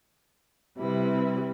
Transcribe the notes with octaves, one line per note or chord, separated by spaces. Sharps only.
C3 G3 E4 B4